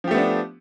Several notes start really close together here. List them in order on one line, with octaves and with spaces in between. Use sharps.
F3 G4 A3 B3 D4